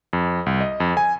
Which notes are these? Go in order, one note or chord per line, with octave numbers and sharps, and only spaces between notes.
F2
C2
D#5
F2
G#5